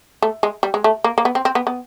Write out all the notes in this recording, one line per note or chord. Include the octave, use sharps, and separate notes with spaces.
A3
G#3
G3
G#3
A3
A#3
A#3
B3
C4
C4
B3
B3